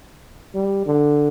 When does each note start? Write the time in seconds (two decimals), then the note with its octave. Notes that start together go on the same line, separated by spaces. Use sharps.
0.54 G3
0.86 D3